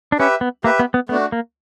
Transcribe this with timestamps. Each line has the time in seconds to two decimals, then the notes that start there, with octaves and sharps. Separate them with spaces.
0.12 D4
0.19 C#4 G4 B4 E5
0.41 B3
0.64 A#3 G4 B4 E5
0.79 B3
0.94 B3
1.09 A3 B3
1.12 D4 F#4
1.32 A#3